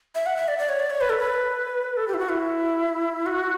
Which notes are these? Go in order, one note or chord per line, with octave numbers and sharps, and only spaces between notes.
E5
F#5
E5
D5
D5
C#5
D5
C#5
B4
A4
B4
A4
G4
E4
F#4
E4
F#4